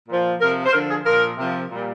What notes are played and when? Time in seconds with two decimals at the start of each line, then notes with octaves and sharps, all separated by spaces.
0.08 A#2 F3
0.40 C3 F3 A#4
0.66 C5
0.72 D3 F3 A#4
0.89 G#4
1.05 A#2 F3 A#4
1.37 C3 F3
1.70 A#2 G3